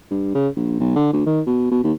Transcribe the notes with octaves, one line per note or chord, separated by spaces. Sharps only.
G2
C#3
A#1
B1
D3
D2
D#3
B2
B2
D#2